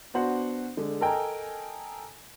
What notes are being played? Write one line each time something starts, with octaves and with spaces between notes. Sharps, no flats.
B3 D4 F#4 C5 F#5
D3 G#3
A4 A#4 D#5 G5 G#5 A#5